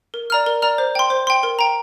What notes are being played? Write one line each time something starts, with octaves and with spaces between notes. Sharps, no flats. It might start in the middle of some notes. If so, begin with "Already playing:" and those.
A#4
D5 A#5 F6
A#4
D5 A#5 F6
C5
G5 C6
C5
G5 C6
A#4
G5 A#5